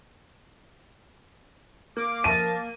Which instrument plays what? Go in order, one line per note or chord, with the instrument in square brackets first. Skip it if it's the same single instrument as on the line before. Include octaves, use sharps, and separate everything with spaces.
[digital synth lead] A#3 [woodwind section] D6
[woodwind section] F3 A#4 A5 [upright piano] D#7